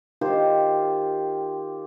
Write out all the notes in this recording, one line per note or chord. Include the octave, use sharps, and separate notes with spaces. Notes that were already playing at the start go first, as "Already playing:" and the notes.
D#3 F4 G4 C5